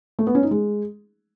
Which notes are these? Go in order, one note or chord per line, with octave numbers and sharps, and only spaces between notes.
A3
B3
C#4
D#4
G#3